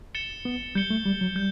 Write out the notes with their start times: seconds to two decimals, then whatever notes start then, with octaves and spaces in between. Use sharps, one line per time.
0.15 A6 C#7 E7 G7
0.45 B3
0.75 G3 G6 C#7 G7
0.90 A3
1.06 G3
1.21 F#3
1.36 G3 G6